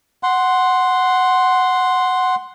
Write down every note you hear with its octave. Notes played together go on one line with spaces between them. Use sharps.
F#5 C6